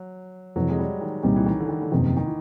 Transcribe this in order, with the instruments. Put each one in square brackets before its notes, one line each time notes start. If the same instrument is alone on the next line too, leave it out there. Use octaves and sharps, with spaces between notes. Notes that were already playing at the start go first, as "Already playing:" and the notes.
Already playing: [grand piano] F#3
[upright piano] F2 C3 E3 [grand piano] F#3
[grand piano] G#3
G3
D#3
[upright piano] C2 A#2 G3 [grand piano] D#3
[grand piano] E3
D#3
D3
D#3
D3
[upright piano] F#1 E2 C3 F3 [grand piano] D#3
[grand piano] D#3
E3